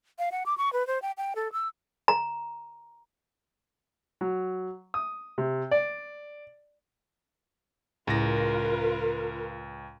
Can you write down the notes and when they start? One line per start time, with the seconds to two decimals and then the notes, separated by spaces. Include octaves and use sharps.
0.19 F5
0.32 F#5
0.46 D6
0.58 C#6
0.73 B4
0.87 C5
1.02 G5
1.18 G5
1.36 A4
1.52 E6
2.08 A#5
4.21 F#3
4.94 D#6
5.38 C3
5.71 D5
8.07 C#2 A2 E4 F4 A#4 B4 A#6